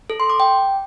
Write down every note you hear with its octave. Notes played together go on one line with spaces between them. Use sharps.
A4
C6
D6
G5